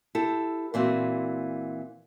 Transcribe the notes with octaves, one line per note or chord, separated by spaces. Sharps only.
E4 G4 A4
A#2 E3 C4 F#4